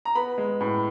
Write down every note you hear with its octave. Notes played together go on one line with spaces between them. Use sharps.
A#5
B3 B5
G#3
A2